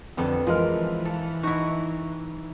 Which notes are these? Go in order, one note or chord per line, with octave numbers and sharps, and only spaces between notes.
F2 D3 G3 B3 A4
E3 F3 G#3 A#4 F6
A4
D#4 E4 F#4